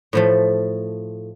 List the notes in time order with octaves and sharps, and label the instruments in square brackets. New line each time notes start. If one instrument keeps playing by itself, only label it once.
[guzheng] A2 F3 A3